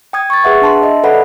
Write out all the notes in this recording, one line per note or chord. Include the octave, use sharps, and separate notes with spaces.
G5 D#6 G#6
C#6 A6
G#4 B4 E5 F#5
D4 A5 C6
D#5 E5
A4 B4 D5 F#5 B5